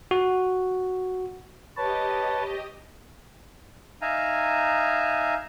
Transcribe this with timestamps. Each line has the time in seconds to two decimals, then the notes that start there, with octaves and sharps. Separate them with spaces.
0.11 F#4
1.77 G4 B4 C#5 D#5 A5
4.02 D#4 E5 F5 G#5 A#5